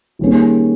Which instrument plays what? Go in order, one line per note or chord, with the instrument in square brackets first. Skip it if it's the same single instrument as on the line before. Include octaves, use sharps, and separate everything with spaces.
[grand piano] D#3 G3 A#3 C#4 G#4